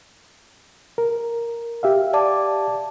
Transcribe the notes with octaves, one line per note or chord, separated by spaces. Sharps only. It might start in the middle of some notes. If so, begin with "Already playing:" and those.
A#4
G4 E5 F5
D5 A5 D6